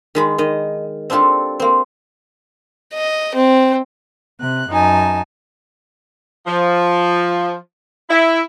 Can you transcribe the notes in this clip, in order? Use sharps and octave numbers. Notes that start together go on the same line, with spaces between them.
D#3 G#3 B5
D#3 D#5
C4 D4 F4 G4 A4
A#3 C4
D#5
C4
C3 F#6
F#2 D#4 G#5 A5
F3
E4